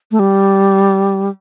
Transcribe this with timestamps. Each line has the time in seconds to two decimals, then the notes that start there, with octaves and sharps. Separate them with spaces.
0.11 A3
0.19 G3